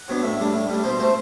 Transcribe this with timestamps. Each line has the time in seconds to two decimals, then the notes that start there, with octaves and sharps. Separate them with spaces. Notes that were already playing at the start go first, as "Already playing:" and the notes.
Already playing: F#5
0.08 F#3 B3 D4
0.23 A2 E5
0.39 G3 D4
0.54 A2
0.69 G3 D4
0.83 B2 C5
0.99 A3 C4 C5